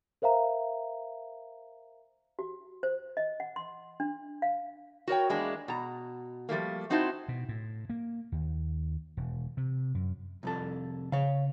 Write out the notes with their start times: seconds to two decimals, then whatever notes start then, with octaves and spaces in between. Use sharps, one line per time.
0.22 A#4 C5 E5 F5 A#5
2.39 F#4
2.83 C5
3.17 D#5
3.40 F#5
3.56 C6
4.00 D4
4.42 F5
5.07 F#4 A#4 C#5 G5
5.29 E2 G#3 A#3 D4
5.68 B2 A#5
6.49 F3 G3 A3 A#3
6.90 C4 D#4 E4 F#4 C5 A5
7.28 B2
7.49 A2
7.90 A#3
8.32 D#2
9.17 E1
9.57 C3
9.95 F#2
10.43 C2 F2 A4
11.12 C#3 C#5 F5